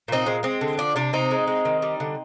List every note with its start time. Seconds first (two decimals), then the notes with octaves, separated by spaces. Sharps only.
0.08 A#2 C4 D#4
0.26 G#3 C4
0.43 G#3 C4
0.61 D3
0.78 F3 D4
0.96 C3 D4
1.13 C3 C4 D#4
1.31 G#3
1.48 G#3
1.65 D#3
1.82 G3
2.00 D3